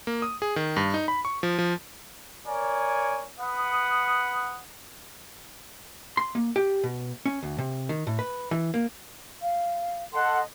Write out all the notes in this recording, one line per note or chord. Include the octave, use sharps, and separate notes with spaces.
A#3
D#6
G#4
D#3
G2
D#4
B5
C#6
F3
F3
A#4 C#5 D5 G#5
B4 F#5 D#6
C6
A#3
G4
B2
C#4
D2
C3
D#3
A2
B4
E3
A#3
F5
A4 D#5 F#5 A5 C6